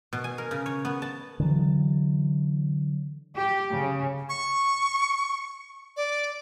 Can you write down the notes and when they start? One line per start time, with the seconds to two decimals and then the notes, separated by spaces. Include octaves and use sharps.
0.13 B2
0.24 G#5
0.38 A#4
0.51 C#3
0.66 C#5
0.85 B3
1.02 A5
1.40 D3 E3 F#3
3.36 G4
3.74 C#3
4.29 C#6
5.96 D5